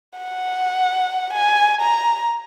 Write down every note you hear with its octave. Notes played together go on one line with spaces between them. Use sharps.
F#5
G#5
A#5